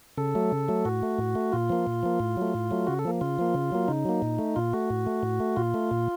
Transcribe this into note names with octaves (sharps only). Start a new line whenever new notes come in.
C#3 A4
F#3 A3
C#3
F#3 A3
A2 F#4
A3
A2
A3
A#2 F4
F3 A#3
A#2
F3 A#3
A2
F#3 A3
A2
F#3 A3
C#3 F#4
A4
F3 A#3
C#3 F4
F3 A#3
C#3
F#3 A#3
C#3 D#4
F#3 A#3
A#2
A3
A#2 F4
A3 F#4
A2
A3
A2
A3
A#2 F4
A3
A#2